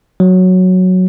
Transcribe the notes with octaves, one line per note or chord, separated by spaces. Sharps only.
F#3